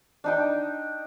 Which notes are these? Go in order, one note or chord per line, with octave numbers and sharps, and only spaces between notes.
D4 D#4 G5